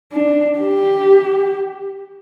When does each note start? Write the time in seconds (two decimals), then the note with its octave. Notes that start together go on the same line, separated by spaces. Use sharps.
0.13 D4
0.59 G4